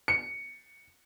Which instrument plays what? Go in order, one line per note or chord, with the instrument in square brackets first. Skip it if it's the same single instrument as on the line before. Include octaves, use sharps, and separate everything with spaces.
[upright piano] C#7